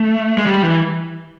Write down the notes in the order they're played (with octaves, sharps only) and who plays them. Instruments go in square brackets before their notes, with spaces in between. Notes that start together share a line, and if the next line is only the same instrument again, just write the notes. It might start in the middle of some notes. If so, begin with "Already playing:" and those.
Already playing: [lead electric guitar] A3
G#3
G3
E3